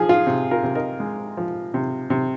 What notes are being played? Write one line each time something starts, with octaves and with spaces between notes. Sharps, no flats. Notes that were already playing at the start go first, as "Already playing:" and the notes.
Already playing: F3 G#4
F4
C3
F4 A#4
C3
A#4 D#5
G#3
F3
C3
C3